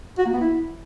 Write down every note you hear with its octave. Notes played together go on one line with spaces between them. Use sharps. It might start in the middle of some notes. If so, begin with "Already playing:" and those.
F#4
A#3
B3
E4